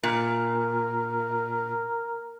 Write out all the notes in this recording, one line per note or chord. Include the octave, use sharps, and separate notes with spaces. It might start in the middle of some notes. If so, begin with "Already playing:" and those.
A#2 A#4